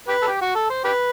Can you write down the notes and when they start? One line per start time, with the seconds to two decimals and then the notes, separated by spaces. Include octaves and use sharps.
0.08 G4 B4
0.22 A4
0.27 G4
0.41 F#4
0.55 A4
0.70 C5
0.84 G4 B4